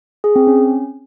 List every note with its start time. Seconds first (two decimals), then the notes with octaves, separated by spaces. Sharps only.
0.24 G#4
0.36 C4
0.47 C#4